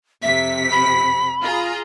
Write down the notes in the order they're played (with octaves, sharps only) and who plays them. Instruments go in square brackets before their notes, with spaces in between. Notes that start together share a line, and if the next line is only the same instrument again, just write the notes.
[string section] F2 C3 B6 [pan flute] E5
[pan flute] B5
[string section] F4 G#4 A#5